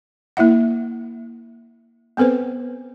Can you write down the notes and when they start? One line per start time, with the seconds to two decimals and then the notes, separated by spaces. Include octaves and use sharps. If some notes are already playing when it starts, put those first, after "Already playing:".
0.37 A#3 E4 E5 F#5
2.17 B3 C4 A4 B4 C5